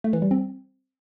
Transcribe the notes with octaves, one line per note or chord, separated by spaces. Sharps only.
A3
E3
G3
C4